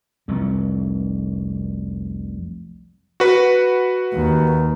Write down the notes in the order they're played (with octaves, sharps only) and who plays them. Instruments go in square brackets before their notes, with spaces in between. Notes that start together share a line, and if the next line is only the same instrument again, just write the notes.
[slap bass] F1 C2 F2
[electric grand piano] F#4 B4
[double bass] D#2